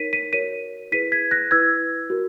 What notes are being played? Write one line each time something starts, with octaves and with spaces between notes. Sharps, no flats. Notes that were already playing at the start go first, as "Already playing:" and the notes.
Already playing: D#4 A#4 C#5 B6 D#7
B6 D#7
F#4 A#4 C#5 B6 D#7
E4 G#4 B4 B6 D#7
G#6 B6
F#6 A#6
E4 B4 E6 G#6
F#4 A#4